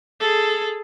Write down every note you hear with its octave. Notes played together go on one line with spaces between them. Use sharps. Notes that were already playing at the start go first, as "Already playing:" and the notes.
G#4 A4